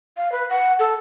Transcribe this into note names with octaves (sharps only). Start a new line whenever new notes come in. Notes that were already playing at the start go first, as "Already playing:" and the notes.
F5
B4
F#5
A4